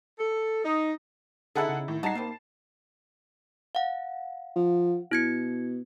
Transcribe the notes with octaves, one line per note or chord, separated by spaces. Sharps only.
A4
D#4
D3 B3 D#4 E4 G#4 A4 F#5
C#3
A2 D#3
G3 G#3 D#4 F#4 A5 C7
D#3 G3 A#3 C4
F5 F#5
F3
B2 E4 G#6 C#7